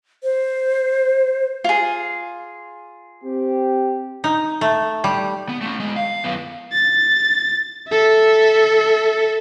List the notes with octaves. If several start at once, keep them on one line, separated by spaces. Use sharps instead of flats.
C5
F4 G#4
C4 G4
D#4
A3
G3
B3
A3 C#4
E2 G#3
F5
F#2 B3
A6
A4 E5